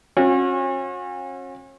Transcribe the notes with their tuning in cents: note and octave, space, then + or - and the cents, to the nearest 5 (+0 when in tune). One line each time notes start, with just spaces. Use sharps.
C#4 -35 F#4 -40